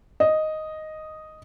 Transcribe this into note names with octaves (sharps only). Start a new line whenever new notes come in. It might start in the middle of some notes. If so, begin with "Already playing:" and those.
D#5